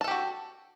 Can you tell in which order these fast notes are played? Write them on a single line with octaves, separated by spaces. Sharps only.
A5 A4 G4 F#4